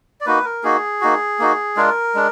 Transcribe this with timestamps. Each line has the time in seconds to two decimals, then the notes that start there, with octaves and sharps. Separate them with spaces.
0.21 D5
0.26 A#3 D#4 F#4 B4
0.44 A#4
0.63 A#3 D#4 F#4 G#4
1.01 A#3 D#4 F#4
1.39 A#3 D#4 F#4
1.76 G#3 D4 F4 A#4
2.15 G#3 D4